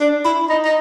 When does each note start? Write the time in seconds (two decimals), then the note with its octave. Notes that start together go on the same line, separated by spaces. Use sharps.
0.01 D4
0.25 E4
0.50 D#4
0.65 D#4